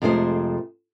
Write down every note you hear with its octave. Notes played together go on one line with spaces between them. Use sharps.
F2 C3 G#3 A3 G#4 C5